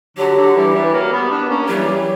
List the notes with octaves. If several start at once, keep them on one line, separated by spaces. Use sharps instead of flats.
D3 F#3 G4
D3 F#3
E3 G3
E3 G3
F#3 A#3
G3 B3
B3 D4
A#3 C#4
A#3
E3 F#3 G3
E3 G3